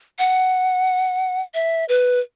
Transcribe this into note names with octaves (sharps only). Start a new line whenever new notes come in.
F#5
E5
B4